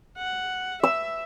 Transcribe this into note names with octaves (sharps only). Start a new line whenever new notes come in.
F#5
E5 E6